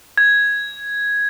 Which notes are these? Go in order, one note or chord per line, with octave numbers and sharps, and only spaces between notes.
G#6